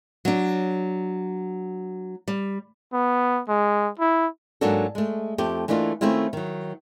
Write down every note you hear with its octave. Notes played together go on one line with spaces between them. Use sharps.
F#3 D4
G3
B3
G#3
E4
G#2 F#3 A#3 D4 F#4 A4
G#3 A3
F2 A3 G4
E3 A3 A#3 D4 D#4 F4
D#3 A3 C4 C#4 E4 F4
D#3 F#3